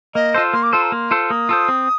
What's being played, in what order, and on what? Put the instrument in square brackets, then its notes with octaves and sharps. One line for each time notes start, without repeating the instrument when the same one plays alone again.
[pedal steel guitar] A#3 [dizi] D#5
[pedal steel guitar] F4 A4 C5
[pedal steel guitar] A#3 [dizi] C6
[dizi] D6
[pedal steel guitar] F4 A4 C5 [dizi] C6
[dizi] A#5
[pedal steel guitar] A#3 [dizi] C6
[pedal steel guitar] F4 A4 C5
[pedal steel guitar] A#3 [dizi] D#6
[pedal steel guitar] F4 A4 C5
C4